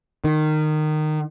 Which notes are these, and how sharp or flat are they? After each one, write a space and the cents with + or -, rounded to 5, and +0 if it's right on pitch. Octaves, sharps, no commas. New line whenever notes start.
D#3 -20